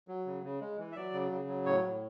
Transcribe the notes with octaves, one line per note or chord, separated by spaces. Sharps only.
F#3
C#3
C#3
G#3
E3
E5
F#3 D5
C#3
C#3
F#3
A2 C#5
A2